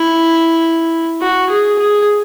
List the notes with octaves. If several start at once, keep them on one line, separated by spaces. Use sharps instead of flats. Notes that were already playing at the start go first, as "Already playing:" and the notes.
Already playing: E4
F#4
G#4
G#4